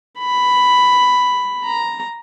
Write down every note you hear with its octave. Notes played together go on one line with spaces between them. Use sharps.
B5
A#5